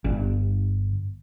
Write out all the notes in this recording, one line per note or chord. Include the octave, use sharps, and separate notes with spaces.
G1 G2